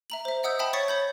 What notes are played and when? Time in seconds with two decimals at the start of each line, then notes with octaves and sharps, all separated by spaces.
0.10 E5 A#5 F#7
0.25 C5 E5
0.43 D#5 F#5 D#6 E6 G6
0.59 E5 G5 A5 B5 D#6
0.73 C#5 C#6 A6 B6 C#7
0.88 C#5 B5 G6